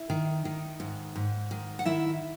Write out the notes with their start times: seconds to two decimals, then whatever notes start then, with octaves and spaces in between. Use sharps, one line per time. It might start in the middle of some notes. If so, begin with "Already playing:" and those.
Already playing: E4 E5
0.10 D#3
0.45 D#3
0.80 G#2
1.16 G#2
1.51 D#3
1.79 F#5
1.85 D#3 E4 E5